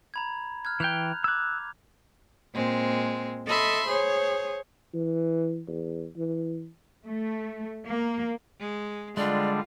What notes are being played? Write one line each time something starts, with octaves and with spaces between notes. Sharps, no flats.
A#5 B5 G#6
F6 F#6 G#6
E3 G5 F#6 G6 F7
D6 E6 F#6 G#6
A#2 G#3 C4
A4 D#5 E5 B5 C6
G#4 C5 C#5
E3
E2
E3
A3
A#3
G#3
D3 G3 G#3 D4 F4 D5